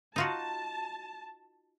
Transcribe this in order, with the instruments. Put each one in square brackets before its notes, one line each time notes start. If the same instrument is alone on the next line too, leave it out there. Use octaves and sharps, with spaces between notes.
[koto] D#4 F4 F#4 [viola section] A5